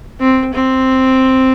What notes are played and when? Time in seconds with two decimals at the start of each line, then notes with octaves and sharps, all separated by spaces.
0.20 C4
0.53 C4